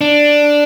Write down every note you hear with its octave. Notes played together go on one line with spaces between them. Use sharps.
D4